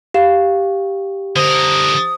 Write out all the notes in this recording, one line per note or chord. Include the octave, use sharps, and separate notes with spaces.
G4 F5 E7
D3 A#4 C5 D#6